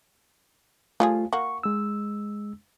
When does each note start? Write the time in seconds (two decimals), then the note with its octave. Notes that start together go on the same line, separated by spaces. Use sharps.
1.00 F3 G3 A3 F4 G#4
1.33 A#3 F#4 C#6
1.63 G#3 E6